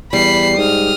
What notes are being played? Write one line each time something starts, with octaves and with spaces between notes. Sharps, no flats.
E2 G3 B5 C7
G#2 D#6 F6